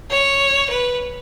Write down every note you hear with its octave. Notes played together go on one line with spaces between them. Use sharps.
C#5
B4